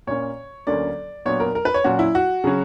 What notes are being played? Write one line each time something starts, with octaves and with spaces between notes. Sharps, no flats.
A#2 A#3 C#4 C#5
D2 D3 F#3 A#3 C#4 D5
A#2 F#3 B3 D4 C#5
A#4
A#4
B4
C#5
A#2 F#3 C#4 F#4
E4
F#4
C#3 F#3 C#4